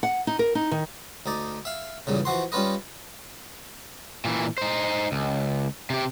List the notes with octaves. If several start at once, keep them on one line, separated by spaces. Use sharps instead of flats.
F#5
D#4
A#4
D#4
D#3
D2 D#4 D5
E5 F5
E2 G2 A#2 C#3
E3 F3 F#4 C6
G3 C#4 F4 B4 D#5
A#2 E3
D#4 C5
C#2
C3 G4